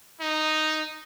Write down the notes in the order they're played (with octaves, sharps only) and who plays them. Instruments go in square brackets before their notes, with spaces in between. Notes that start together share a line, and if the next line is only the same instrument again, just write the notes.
[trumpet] D#4